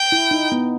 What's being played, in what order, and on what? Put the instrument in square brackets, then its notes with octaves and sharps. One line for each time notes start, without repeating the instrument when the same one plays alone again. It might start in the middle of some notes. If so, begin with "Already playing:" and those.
Already playing: [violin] G5
[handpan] E4
D#4
B3